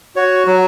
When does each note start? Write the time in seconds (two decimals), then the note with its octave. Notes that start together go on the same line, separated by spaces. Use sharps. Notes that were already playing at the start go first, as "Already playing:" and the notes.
0.16 F#4 C#5
0.47 F#3